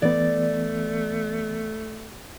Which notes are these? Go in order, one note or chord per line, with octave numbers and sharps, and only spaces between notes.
E3 A3 B3 D5